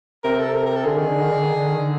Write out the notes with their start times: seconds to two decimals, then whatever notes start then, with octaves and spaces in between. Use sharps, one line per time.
0.24 C3 A#4
0.39 A4
0.54 A#4
0.66 A#4
0.76 A4
0.85 D3 G#4
0.96 D#3
1.08 D3
1.21 D#3
1.31 D3
1.43 D#3
1.54 D3
1.67 D#3
1.78 D3